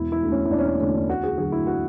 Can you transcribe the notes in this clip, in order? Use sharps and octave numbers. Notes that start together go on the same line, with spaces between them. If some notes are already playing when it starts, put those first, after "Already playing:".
Already playing: E1 E4
E4
D2 D3 A3
C#4
E4
E1 D4
C#4
D4
D2 D3 A3 C#4
D4
D2 F#4
G#4
D3 F#3 A3 G#4
E4
F#4